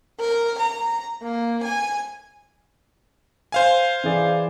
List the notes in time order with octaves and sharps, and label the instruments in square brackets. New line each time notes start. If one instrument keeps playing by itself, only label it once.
[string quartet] A#4
A#5
A#3
G#5
[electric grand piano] C5 F5 G#5
[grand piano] E3 G#4 D5